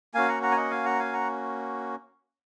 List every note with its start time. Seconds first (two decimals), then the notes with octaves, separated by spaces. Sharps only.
0.14 A#3 C#4 F#4 F5 G#5
0.28 F#5 A#5
0.43 F#5 A#5
0.51 G#5
0.57 D#5 F#5
0.71 F5 G#5
0.85 F#5 A#5
0.99 F5 G#5
1.13 F#5 A#5